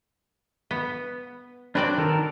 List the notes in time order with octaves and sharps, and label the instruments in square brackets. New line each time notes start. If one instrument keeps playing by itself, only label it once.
[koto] B3
[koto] F#3 C4 D5 [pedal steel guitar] D4 B4
[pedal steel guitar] D#3 A4 A#4